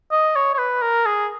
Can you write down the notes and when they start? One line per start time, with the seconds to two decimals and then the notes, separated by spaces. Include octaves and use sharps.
0.12 D#5
0.36 C#5
0.54 C#5
0.58 B4
0.82 A#4
1.06 G#4